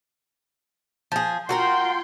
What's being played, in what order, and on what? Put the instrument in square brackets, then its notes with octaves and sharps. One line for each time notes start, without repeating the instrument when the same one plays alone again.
[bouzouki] F3 G#4
[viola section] F4 G5 C6 [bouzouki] F#4 A4 A#4